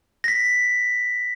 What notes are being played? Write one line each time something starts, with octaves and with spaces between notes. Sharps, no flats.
A#6 B6